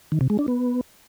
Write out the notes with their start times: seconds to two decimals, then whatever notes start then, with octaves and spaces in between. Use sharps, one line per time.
0.12 D#3
0.21 C3
0.30 G#3
0.39 D4
0.48 B3